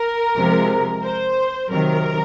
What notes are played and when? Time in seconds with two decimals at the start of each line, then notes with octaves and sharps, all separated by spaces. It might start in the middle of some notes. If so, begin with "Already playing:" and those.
Already playing: A#4
0.36 C3 F3 G#3
1.04 C5
1.70 C3 D#3 F#3 A#4